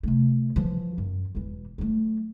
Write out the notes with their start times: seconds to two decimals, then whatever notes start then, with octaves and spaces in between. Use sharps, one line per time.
0.03 C3 A3
0.56 E3 F3
0.98 F#2
1.35 E1 E3
1.78 F#3 A3